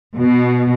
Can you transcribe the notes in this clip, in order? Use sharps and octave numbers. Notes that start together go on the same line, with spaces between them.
B2